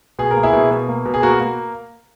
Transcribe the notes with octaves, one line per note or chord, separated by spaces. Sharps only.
B2 G#4
A#4
A#3
E4 G#4
B2
B2
A#3
B2
G#4
A#3 F#4 A#4
A#3